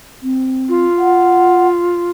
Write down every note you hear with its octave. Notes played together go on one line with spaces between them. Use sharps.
C4
F4
F#5